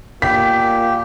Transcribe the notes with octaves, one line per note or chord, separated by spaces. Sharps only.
A#2 G4 B6